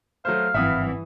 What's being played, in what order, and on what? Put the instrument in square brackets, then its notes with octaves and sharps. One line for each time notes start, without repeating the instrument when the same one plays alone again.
[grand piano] F#3 A3 C5 [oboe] F5
[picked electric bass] G#1 C4 [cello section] G2 E3 [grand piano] E5 F#5 D#6